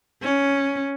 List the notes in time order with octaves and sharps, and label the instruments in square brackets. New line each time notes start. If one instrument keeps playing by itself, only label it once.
[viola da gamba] C#4